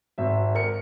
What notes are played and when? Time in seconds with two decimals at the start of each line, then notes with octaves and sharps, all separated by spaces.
0.18 G#1 E5
0.55 A#4 C#7